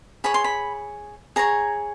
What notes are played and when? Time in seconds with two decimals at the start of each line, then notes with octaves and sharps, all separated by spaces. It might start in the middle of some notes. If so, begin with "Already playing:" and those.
0.24 G#4 C#5 B5
0.34 C6
0.44 B5
1.36 G#4 C#5 A#5